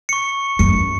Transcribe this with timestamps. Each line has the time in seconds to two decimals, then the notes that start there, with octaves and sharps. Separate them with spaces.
0.09 C#6 C#7
0.59 F#2 C#7